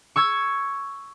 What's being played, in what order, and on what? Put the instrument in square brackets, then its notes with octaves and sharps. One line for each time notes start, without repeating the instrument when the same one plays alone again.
[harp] C#6 E6 G#6